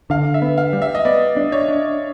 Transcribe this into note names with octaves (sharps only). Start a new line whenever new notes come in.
D3 F5
E5
B3
F5
G3
E5
D#5
B3 D5
D4
C#5
D4